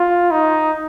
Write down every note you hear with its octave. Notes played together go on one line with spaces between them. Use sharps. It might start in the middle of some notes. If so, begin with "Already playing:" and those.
Already playing: F4
D#4